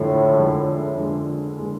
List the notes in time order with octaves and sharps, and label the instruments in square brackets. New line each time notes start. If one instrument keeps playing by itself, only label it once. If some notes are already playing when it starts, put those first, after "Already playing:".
Already playing: [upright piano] F2 D3 G#3 [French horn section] A2
[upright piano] F2 D3 G#3
F2 D3 G#3
D3 G#3